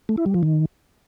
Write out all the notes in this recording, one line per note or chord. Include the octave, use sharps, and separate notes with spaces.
A3
E4
G3
F3
D#3